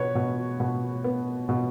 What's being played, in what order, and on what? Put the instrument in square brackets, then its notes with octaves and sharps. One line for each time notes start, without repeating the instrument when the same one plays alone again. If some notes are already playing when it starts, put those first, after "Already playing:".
Already playing: [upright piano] B2 B4 C#5
B2
B2
B3
B2